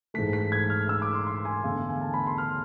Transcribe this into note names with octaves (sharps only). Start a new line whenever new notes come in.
G#2 E3 A3 B6
B6
G#6
F6
E6
D6
C6
C6
G#5
E2 D3 A3 F5
G#5
A5
B5
C6
F6